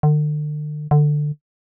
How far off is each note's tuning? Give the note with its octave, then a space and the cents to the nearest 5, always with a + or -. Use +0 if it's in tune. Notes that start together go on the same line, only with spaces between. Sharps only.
D3 +40
D3 +15